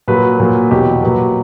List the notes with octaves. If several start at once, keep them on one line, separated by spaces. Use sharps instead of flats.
A#2 F#3 B4
A#2 F#3
E2 B2 F#3 G4
A#2 F#3 B4